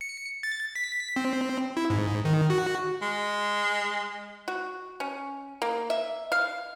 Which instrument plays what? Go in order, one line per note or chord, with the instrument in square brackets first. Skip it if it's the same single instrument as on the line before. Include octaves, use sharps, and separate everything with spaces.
[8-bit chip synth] C#7
A6
B6
C4
E4
G#2
D#3
F#4
[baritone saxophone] G#3
[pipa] F#4
C#4
A#3
E5
F5